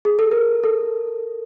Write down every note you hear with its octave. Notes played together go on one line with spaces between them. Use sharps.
G#4
A4
A#4
A4